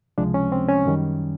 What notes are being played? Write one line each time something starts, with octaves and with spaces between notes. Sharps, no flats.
C#2 C3 F3 G#3 D4
C#4
C4
C#4
F#2 D#3 G3